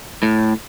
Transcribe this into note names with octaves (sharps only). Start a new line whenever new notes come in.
A2